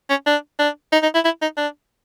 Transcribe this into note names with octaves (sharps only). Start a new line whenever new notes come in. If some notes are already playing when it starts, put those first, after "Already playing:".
C#4
D4
D4
D#4
D#4
E4
E4
D#4
D4